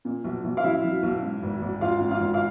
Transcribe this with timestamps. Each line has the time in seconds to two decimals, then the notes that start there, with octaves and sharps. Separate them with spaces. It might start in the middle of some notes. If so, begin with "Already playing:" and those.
0.05 A#2
0.24 B1
0.44 B1
0.57 F5
0.64 F#3 E4 E5
0.84 F#3
1.03 B1
1.22 G#2
1.42 G#1
1.62 G#1
1.81 G#1 F4 F5
2.01 G#2
2.11 F4 F5
2.21 G#1
2.34 F5